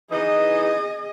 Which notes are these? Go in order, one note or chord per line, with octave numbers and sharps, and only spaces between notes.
E3 D#4 G#4 D#5